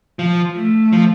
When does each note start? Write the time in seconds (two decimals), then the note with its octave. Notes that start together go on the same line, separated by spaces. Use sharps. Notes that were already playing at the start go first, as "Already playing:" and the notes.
0.19 F3
0.56 A3
0.93 F3